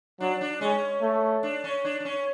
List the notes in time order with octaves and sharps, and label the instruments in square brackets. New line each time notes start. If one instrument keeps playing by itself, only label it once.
[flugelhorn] F#3 [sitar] D4
[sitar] D4
[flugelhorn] G#3 [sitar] C#4
[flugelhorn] A3
[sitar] D4
C#4
D4
D4
C#4